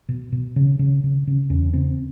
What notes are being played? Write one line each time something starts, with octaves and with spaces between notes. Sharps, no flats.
B2
B2
C#3
C#3
C#3
C#3
E2 C#4
C#3 C4